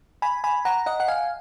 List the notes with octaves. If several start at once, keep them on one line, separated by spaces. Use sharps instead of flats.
G#5 B5
G#5 B5
F#5 A#5
D#5 F#5
F#5
F5 G#5